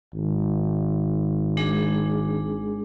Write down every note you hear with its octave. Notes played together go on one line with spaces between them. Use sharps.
G#1
G#3 D4 G#4